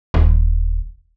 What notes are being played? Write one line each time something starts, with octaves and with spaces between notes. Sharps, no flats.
D#1